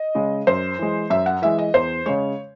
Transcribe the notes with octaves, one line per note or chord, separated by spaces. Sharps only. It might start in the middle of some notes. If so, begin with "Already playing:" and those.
Already playing: D#5
C#3 G#3
F#2 C5
E3 G#3
F#2 E5
F#5
E3 G#3 E5
D#5
E2 C5
C#3 G#3 C#5